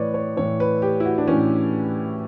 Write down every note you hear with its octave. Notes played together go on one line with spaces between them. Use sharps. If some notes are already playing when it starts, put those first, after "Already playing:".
Already playing: A2 E3 B4 C#5 D5
C#5
A2 E3 C#5
B4
G4
E4
F#4
D4
A2 E3 C#4